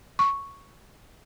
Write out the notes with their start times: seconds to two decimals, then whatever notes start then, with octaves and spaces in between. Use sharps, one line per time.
0.19 C#6